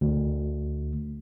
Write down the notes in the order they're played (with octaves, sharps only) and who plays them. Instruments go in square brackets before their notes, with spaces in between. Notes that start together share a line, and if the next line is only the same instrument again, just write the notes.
[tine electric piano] D2